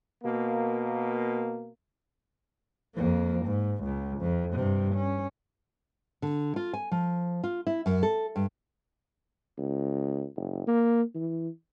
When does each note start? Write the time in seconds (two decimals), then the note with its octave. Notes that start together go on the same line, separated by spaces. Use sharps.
0.24 B2 A#3
2.96 F2 A#3
3.47 G#2
3.84 C#2
4.20 F2
4.54 G2 C3
4.95 C#4
6.22 D3
6.56 F4
6.73 G#5
6.91 F3
7.44 F4
7.67 E4
7.86 F#2
8.03 A4
8.36 G2
9.58 C#2
10.37 F#1
10.67 A#3
11.15 E3